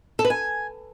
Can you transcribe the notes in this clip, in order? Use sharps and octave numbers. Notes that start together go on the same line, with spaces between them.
A4
B4
G#5